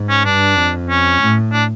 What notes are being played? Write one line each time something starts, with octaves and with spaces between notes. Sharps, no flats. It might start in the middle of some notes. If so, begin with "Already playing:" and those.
Already playing: G#2
C#4
G2 D4
F2
C#4
A2
D4